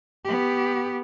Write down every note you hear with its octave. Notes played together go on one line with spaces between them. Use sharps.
B3 G4